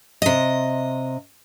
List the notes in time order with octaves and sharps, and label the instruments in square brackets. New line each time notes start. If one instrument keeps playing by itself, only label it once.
[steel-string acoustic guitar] C3 D#5